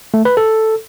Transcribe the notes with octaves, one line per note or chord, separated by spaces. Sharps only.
A3
B4
A4